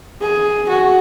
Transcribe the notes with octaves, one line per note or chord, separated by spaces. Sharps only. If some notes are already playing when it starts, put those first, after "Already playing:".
G#4
F#4